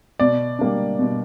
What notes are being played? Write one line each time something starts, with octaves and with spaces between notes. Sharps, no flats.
B2 D5
G3 A#3 D4
B2